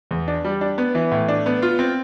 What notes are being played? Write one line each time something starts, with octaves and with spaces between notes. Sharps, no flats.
E2
D4
G3
D4
B3
E3
A2
D4
B3
F4
C4